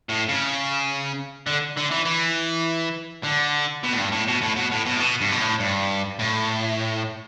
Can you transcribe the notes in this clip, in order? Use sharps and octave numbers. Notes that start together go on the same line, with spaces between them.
A2
C#3
D3
D3
E3
E3
D3
B2
A2
G2
A2
B2
A2
B2
A2
B2
A2
B2
G2
B2
A2
G2
A2